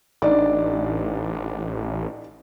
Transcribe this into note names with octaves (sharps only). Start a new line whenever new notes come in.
A1 D4 D#4 D5